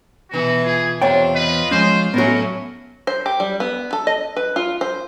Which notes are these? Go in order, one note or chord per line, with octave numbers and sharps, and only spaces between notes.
B2 E3 F#4
F4 G#4
E2 C3 D4 F4 C#5 G5
B4 D#5
F3 G#3 C#4 C5
A2 F#3 B3 C#4 F#4 A#4
C5
G4
G3
B3
A4
D#5
B4
F4
C5